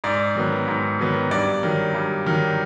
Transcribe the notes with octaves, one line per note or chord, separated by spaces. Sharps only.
G#2 D5
D#3 F#3 B3
G#2
D#3 F#3 B3
G2 D5
D#3 F#3
G2
D#3 F#3